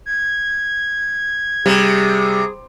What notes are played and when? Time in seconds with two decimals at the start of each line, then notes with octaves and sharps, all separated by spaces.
0.06 G#6
1.66 C3 G3 G#4